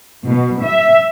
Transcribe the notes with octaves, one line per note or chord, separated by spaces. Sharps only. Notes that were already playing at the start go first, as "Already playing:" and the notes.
B2
E5